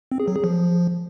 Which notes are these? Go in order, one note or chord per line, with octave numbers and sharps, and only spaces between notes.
C4
G#4
F#3
G#4
F3